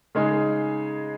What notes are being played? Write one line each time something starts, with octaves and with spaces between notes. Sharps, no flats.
C#3 G#3 D#4 G#4